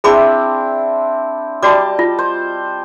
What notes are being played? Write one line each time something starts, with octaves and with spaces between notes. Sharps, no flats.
C4 D4 E4 G#4 B5 D6
G3 F#4 D5 D#5 A5 D6
F4
C5